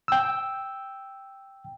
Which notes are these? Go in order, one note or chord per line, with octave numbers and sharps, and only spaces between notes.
G5 E6